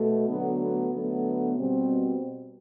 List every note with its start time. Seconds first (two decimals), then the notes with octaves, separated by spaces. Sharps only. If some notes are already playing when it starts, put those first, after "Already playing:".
Already playing: B2 A3
0.28 D3 F#3 A3 B3
0.60 B3
0.92 D3 F#3 A3 B3
1.57 B2 G3 C4